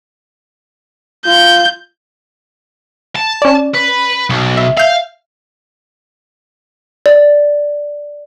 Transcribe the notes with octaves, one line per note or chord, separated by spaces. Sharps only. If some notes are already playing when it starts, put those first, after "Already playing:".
F4 G6
A5
C#4 D5
B4
B1
E5
E5 F5 G6
D5